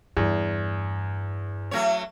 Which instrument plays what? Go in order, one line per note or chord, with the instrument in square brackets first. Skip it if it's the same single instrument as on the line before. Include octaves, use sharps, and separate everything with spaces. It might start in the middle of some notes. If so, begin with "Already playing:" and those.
[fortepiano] E2 [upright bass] G2
[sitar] F#3 A3 C#5